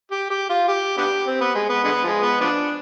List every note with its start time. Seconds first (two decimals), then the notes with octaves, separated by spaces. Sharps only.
0.11 G4
0.30 G4
0.50 F4
0.68 G4
0.97 B3 D4 G4
1.27 C4
1.41 B3
1.55 G#3
1.69 B3
1.84 D3 G#3 B3
2.04 F3 G#3
2.22 B3
2.41 F3 B3 D4